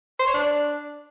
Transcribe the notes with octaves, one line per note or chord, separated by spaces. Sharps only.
C5
C#5
D4